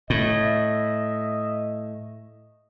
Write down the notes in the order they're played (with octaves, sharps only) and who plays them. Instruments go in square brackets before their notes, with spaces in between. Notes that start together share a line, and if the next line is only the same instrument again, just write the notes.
[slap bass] A2 [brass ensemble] D#5 E5